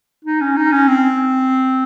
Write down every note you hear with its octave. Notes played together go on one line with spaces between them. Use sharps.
D#4
C#4
D#4
C#4
C4